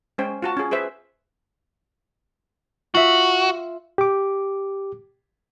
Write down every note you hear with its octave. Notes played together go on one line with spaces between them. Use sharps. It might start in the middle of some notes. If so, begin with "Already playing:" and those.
G#3 C#4 C5 G5
F4 F#4 A5
C#4 F4 G#4
G#4 B4 C5 E5
F4 F#4 E5
G4 D6